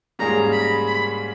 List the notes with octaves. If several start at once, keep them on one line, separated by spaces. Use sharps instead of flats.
G#2 G3 A#3 C#4 G#4 A#5
B5
B5